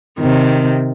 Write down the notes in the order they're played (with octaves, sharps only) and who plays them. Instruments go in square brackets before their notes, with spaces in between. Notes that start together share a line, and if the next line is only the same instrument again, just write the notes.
[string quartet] C3 D#3